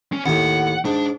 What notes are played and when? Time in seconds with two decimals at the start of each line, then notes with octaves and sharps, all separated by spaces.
0.13 C#4
0.26 D#2 A2 F#5
0.85 G#2 D4